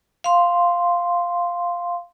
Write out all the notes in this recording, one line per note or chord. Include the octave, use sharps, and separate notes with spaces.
F5 C6